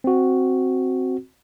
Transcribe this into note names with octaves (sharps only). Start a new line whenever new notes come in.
C4 F#4